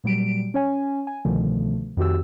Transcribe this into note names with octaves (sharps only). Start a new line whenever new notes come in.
A#2 F#3 G3 D7
C#4 C#5 G#5
G#5
C2 B2 D3 D#3 F3 A3
F2 D#3 F#4 G4 E6